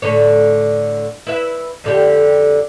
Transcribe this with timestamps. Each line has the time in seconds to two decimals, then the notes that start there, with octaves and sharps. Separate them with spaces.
0.02 A2 D3 C#5
1.27 E4 B4 E5
1.84 F2 D3 G4